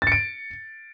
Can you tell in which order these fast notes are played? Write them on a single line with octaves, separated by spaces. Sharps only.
A6 C#7 D7